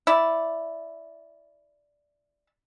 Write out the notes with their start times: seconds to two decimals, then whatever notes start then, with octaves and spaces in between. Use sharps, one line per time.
0.07 E4 D5